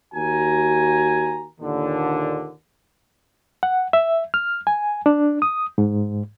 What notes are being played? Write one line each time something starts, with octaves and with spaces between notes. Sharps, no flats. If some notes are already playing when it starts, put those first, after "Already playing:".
D#2 F#4 G#5 A#5
D#2 A#2 D3
F#5
E5
F6
G#5
D4
D#6
G#2